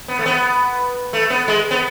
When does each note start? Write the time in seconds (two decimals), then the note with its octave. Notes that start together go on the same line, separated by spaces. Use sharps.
0.08 B3
0.19 A3
0.26 B3
1.13 A3
1.30 B3
1.48 G#3
1.71 B3